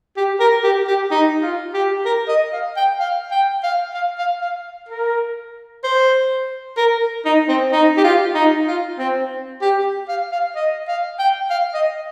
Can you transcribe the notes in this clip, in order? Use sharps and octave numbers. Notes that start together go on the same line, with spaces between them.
G4
A#4
G4
G4
D#4
F4
G4
A#4
D#5
F5
G5
F5
G5
F5
F5
F5
F5
A#4
C5
A#4
D#4
C4
D#4
G4
F4
D#4
F4
C4
G4
F5
F5
D#5
F5
G5
F5
D#5